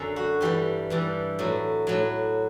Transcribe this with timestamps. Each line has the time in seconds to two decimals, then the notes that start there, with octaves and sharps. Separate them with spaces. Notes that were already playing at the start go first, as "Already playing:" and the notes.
Already playing: F#2 D3
0.16 F#4
0.41 G2 E3 G3 G4
0.90 G2 E3 G3
1.39 A2 F#3
1.87 A2 F#3